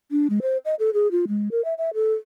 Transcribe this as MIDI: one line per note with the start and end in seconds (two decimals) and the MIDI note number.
0.11 0.27 62
0.30 0.40 56
0.42 0.58 72
0.65 0.75 75
0.79 0.90 69
0.94 1.10 68
1.11 1.25 65
1.28 1.49 56
1.51 1.63 70
1.65 1.74 76
1.78 1.90 76
1.94 2.14 69